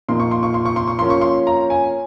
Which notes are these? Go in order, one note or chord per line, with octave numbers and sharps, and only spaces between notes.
A#2 F3 A#3 D#4 C6
C#6
C6
C#6
C6
C#6
C6
C#6
F3 A#3 C#4 C6
C#6
C6
A#5
G#5